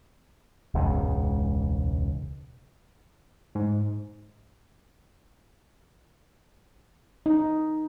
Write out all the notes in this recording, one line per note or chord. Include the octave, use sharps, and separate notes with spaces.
E1 C#2 G#2
G#2
D#4